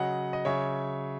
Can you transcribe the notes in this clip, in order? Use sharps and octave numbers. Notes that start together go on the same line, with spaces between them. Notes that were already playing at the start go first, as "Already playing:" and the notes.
Already playing: C#3 F#3 D#5 F#5
D#5
C#3 F#3 C#5 E5